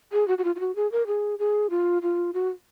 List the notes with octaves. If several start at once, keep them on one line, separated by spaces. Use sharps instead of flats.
G#4
F#4
F#4
F4
F4
F#4
G#4
A#4
G#4
G#4
F4
F4
F#4